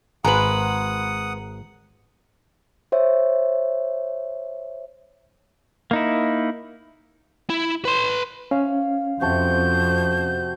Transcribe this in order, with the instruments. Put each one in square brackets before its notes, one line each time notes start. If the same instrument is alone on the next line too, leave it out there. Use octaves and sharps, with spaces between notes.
[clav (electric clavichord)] G#1 [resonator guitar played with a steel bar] G#3 B4 [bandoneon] F#5 D#6 [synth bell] A#5 F#7
[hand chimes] C5 C#5 E5
[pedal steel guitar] A#3 D#4 E4
[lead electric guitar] E4
B4 C6
[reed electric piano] C#4 [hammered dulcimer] F5
[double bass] F2 [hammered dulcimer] C3 F#4 A5 [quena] G6